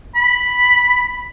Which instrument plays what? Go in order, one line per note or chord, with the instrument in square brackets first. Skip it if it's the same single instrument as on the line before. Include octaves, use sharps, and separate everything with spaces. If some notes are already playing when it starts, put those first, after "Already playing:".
[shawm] B5